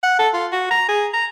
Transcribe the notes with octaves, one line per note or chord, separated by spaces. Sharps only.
F#5
A4
F4
F#4
A#5
G#4
A#5